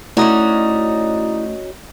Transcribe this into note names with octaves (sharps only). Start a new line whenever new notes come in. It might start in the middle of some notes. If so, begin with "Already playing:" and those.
A3 C#4 D#4 E4 F#4 D5 A#5 D#6